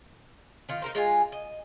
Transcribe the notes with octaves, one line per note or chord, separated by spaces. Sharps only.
D#3 F4
D#4 A#4 C5
G#3 F4 G5 G#5
D#5